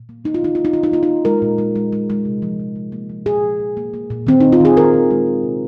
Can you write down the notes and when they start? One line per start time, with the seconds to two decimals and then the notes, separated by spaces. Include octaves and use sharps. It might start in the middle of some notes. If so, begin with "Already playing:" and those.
Already playing: A#2
0.09 A#3
0.25 A#3 D#4
0.34 F4
0.42 D#3 D#4
0.55 A#3 F4
0.65 D#4
0.73 D#3 F4
0.83 D#4
0.92 A#3 F4
1.03 D#4
1.09 A#3
1.25 G#3 A#4
1.42 A#2
1.58 G#3
1.75 G#3
1.93 G#3
2.10 G#3
2.25 C3
2.42 F3
2.60 C3
2.76 C3
2.92 A#3
3.10 F3
3.26 A#2 G#4
3.43 F3
3.60 A#2
3.77 A#3
3.94 A#3
4.10 A#2
4.27 D#3 C4
4.41 D#3 D#4
4.53 F4
4.60 D#3 G#4
4.77 D#3 A#4
4.94 D#3
5.11 G#3
5.27 G#3
5.43 C3